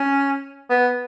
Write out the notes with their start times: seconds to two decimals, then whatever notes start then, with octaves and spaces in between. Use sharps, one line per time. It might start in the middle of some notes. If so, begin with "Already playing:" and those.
Already playing: C#4
0.70 B3